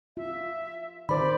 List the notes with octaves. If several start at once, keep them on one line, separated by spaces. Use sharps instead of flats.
F4 E5
D#3 C5 D5 B5